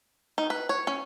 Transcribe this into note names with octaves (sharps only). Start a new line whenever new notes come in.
D#4
B4
C#5
C#4